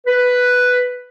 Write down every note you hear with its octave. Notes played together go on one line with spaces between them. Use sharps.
B4